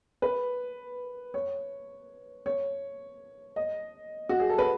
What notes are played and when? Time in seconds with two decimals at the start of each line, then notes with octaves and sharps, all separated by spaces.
0.22 B4
1.34 C#5
2.46 C#5
3.56 D#5
4.29 F#4
4.40 G#4
4.49 A4
4.58 B4